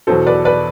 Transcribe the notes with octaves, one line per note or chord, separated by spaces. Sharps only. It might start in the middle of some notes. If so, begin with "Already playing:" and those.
E2 B2 F#3 A4 C5
B4 D5
B4 D5